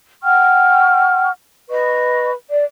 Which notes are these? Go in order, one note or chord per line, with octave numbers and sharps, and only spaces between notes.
F#5 G5 C#6 F6
B4 D#5 C#6
D5